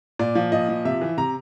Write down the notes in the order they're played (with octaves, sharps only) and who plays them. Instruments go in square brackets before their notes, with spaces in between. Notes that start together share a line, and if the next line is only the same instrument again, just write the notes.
[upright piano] A#2 D5
F3
A#2 D#5
F3
C3 E5
E3
C3 A#5